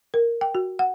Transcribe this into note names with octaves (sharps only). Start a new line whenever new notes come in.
A#4
G5
F#4
F#5